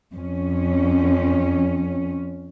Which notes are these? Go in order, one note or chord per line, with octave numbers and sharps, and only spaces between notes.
F2 C#4